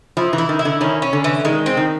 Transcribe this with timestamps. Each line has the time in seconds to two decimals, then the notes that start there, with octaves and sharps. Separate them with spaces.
0.17 F3 E4
0.33 E3
0.38 E4
0.49 D#3
0.59 E4
0.65 D3
0.81 D#3 C#4
1.02 C#4
1.13 D3
1.24 E3
1.45 D#3 G#3
1.66 C4
1.77 D#3